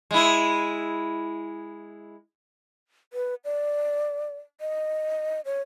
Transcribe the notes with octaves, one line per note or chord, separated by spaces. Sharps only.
G#3 E4
B4
D5
D#5
C#5